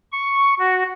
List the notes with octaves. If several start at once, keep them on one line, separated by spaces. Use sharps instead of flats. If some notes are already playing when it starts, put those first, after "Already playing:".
C#6
F#4